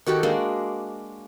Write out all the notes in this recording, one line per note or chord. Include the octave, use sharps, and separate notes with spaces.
D#3 F#4 G4 A4
G#3 A#3 D4